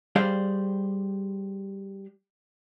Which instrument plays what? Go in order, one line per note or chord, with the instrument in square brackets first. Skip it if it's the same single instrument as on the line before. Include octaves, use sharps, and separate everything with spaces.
[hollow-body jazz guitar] G3 G4 G#4 C5 D5 F5